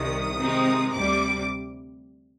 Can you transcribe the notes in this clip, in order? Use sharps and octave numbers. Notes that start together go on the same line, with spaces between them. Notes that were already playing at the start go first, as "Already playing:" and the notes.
Already playing: C2 C3 D#3 D#6
C3 D#3 G#3 C4 D#4
D2 C3 G3 D6